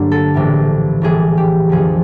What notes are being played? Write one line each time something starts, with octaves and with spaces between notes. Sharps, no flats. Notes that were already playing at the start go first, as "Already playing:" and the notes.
Already playing: G2 D3 F#3 A#3 D4
A4
A#1 A2 E3 G3
A#1 A2 E3 G3 G#4
G4
F2 D3 F3 A#3 G#4